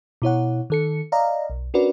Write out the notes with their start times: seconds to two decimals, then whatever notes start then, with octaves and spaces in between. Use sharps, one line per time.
0.22 B2 E4 C#5 F#5
0.70 D#3 A4 C#7
1.12 D5 D#5 F5 A#5
1.50 B1
1.74 C#4 D4 F#4 A#4 B4 D5